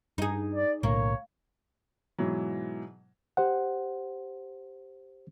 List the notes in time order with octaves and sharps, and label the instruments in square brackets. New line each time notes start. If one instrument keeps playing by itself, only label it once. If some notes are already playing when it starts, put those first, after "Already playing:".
[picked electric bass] G2 [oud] D#4 G#4
[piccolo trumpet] D5
[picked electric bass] B1 A2 D3 [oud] A#3 [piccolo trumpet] C#5
[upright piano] G#2 B2 E3 F#3
[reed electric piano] G4 C5 F#5